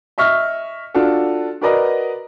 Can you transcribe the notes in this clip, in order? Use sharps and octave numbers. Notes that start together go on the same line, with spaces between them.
D#5 E5 C#6 F6
D4 F4 F#4 A4
F#4 A#4 B4 D5 D#5 A#5